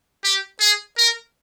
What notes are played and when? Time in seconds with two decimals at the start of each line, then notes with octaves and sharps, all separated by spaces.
0.24 G4
0.60 G#4
0.97 A#4